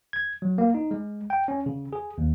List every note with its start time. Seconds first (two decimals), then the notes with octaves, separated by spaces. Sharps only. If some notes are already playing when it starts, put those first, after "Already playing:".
0.13 G#6
0.42 F#3
0.58 A#3
0.74 D#4
0.91 G#3
1.30 G5
1.48 C#4
1.66 C#3
1.93 G#4
2.18 D#2